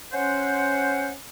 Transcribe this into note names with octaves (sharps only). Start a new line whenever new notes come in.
C#4 C5 F#5